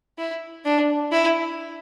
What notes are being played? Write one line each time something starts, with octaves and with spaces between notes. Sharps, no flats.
E4
D4
E4